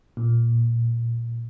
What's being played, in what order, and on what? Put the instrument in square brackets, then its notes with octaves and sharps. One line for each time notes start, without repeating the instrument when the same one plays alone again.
[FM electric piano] A#2